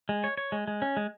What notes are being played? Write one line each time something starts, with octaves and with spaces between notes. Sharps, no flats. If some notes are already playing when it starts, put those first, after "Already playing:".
G#3
C#5
C#5
G#3
G#3
C#4
G#3